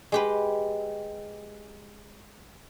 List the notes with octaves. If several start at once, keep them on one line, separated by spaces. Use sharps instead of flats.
G#3 G4 B4